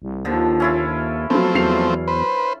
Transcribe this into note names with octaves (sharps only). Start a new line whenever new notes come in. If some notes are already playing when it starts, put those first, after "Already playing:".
C2
D#2 D3 F3
C#4 E4 F4
F3 F#3 A3 B3 C4
E2 F#3 C7 F7
B4 C5